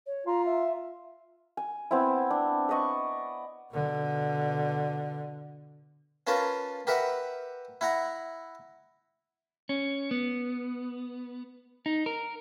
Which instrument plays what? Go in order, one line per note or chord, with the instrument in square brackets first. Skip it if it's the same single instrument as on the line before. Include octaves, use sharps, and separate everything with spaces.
[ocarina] C#5
[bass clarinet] F4 [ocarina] A#5
[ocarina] E5
[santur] G#5
B3 C4 E4
D4
B4 D5 D#5 C#6
[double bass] B2 D3
[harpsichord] C#4 F4 A#4 B4 A5
G4 A#4 B4 E5 F#5
E4 F#5 A#5
[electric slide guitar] C#4
B3
D#4
A#4